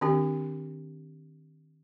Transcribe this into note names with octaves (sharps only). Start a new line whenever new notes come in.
D#3 C4 D4 G4